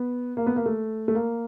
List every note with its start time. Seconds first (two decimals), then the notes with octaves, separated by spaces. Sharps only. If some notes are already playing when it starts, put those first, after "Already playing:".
Already playing: B3
0.37 A#3
0.47 B3
0.56 A#3
0.66 A3
1.08 A3
1.15 A#3